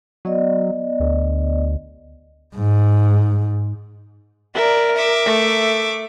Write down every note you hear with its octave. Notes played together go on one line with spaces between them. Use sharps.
F#3 B3 D5 D#5
D2
G#2
A#4 D5 E5
E5 D6
A3